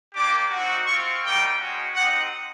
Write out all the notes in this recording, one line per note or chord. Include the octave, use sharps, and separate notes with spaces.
A#3 D4 G4 D6
C4 D#4 F#4
C4 F4 C#6
G3 A#3 D#4 F#4 G5
G#3 C#4 F#4
C4 D#4 G4 F#5